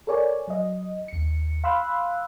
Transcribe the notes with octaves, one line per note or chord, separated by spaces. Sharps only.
A4 A#4 C#5 D5 G#5
F#3 D#5
D#2 C#7
F5 B5 C6 E6 F#6